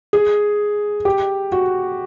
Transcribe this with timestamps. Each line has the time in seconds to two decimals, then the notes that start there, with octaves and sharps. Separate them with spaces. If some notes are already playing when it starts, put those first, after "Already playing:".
0.13 G#4
1.05 G4
1.52 F#4